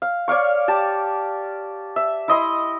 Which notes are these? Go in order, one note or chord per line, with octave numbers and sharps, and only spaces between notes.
F5
C#5 D5 F5 C#6
G4 A5
E5
E4 D#5 C6